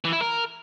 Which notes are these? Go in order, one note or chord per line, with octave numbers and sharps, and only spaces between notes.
E3
E4
A#4